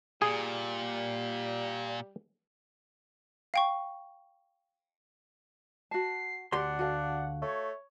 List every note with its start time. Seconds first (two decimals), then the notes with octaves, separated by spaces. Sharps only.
0.22 A#2 G3 G#4
3.54 F5 G5 C#6
5.91 F#4 A5 C7
6.52 D2 D4 G4 F#5 C6
6.79 F#4 A4 F5
7.42 A3 C#5